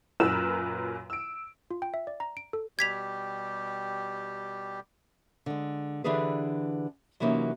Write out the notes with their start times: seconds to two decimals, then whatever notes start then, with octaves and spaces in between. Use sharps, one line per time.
0.20 F#2 A#2 A#4 B4 E6 E7
1.10 E6 D7
1.71 F4
1.82 G5
1.94 E5
2.07 D5
2.20 A#5
2.37 D7
2.53 A4
2.79 B2 G3 G4 G#6 B6 F7
5.46 D3 G#3
6.04 D3 E3 D4 G4 G#4 B4
7.20 C3 E3 F#3 A#3 C#4 D#4